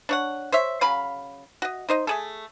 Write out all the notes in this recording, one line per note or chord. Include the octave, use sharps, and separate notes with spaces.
D4 C#5 F#5
C5 C#5 E5
C#3 F#3 F5 B5
F#4 D#5
D#4 C5 D#5
A3 G#4 A4